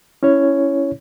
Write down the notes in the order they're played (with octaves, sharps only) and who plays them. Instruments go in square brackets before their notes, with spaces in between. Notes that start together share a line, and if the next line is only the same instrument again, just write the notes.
[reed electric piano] C#4 E4 C#5